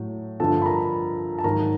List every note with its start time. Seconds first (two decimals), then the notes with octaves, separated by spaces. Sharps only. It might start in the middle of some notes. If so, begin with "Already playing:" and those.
Already playing: A2 F#3
0.40 G2 D3 F3 A4 A5
0.62 B5
0.66 A#4 A#5
1.39 A5
1.44 G#2 D#3 F#3 A#4 A#5